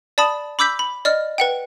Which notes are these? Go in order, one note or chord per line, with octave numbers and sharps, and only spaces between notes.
D5 A5 B5 D#6
B5 D6 E6 G6 B6
B5
D5 D#5 F6
B4 F#5 G5